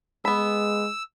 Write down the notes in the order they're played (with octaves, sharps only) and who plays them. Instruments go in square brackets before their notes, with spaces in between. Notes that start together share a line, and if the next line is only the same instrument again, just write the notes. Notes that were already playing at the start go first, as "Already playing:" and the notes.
[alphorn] G#3 [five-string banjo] B3 B5 [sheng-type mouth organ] E6